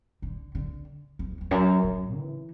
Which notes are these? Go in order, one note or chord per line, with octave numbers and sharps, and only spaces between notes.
D3
D3
E2
E2
F#2
F#2
E3